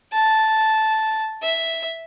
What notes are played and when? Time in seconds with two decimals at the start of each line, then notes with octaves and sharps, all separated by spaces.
0.13 A5
1.42 E5